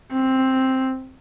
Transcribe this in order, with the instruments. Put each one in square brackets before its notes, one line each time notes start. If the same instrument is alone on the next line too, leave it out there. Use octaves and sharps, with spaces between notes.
[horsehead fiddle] C4